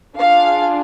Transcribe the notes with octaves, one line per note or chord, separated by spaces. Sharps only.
D4 F4 G#4 F5